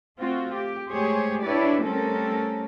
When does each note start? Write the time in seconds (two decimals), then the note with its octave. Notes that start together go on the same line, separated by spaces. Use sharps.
0.19 A3 C4 F4 F#4
0.53 G4
0.89 G#3 A3 G4 G#4 C5 C#5
1.43 D4 E4 G4 B4 C#5 D5
1.83 G3 A3 C4 C#4 A4 A#4